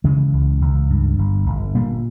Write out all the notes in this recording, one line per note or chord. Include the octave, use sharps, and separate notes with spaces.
C#3 E3 G#3
C#2
C#2
G2
G1
G1
A#2 G3 A#3